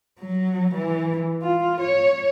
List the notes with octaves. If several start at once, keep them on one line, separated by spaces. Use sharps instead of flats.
F#3
E3
F4
C#5